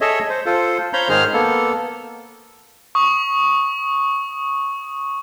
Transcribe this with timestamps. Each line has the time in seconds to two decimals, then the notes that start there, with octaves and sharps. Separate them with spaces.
0.01 G#4 A4 C#5 D#5 E5
0.29 C5
0.46 F4 A4 C5
0.93 C5 C#5 F5 A#5 B5 G6
1.09 G#2 D#3 G#4 C5 F6
1.33 A#3 B3 A4
2.95 C#6 D#6